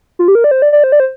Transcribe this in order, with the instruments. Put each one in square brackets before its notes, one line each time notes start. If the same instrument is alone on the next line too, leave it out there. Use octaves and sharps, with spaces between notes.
[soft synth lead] F4
G4
A#4
D5
C5
D5
D5
C5
D5
C5